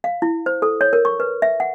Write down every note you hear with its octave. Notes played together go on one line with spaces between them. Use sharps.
F5
E4
C5
A4
C#5
A#4
C#6
B4
E5
F#5